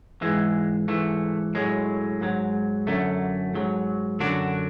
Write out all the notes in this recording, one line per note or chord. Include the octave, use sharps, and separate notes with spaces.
G#2 E3 G#3
G#2 E3 A3
A2 F#3 G#3
G#2 F#3
F#2 D3 F#3 A3
G#2 F#3
F#2 D3 F#3 D4 F#4